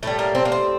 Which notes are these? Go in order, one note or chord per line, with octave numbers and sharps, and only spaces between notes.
A2 G3 A3
A#3
C4
A#3
C4